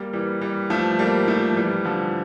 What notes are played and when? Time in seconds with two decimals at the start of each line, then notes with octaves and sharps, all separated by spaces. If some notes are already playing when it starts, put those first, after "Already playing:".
Already playing: G3 A#3
0.13 E3 G3
0.41 E3 G3
0.70 F3 A3
0.99 G3 A#3
1.28 F3 A3
1.57 E3 G3
1.85 D3 F3